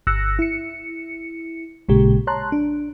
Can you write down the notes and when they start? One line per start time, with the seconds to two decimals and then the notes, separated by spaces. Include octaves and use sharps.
0.07 G1 E6 F#6 A#6 C#7
0.39 E4 C#7
1.88 A1 A#2 C#3 G#3 G4
2.27 C#5 A5 A#5 C6 F#6
2.52 D4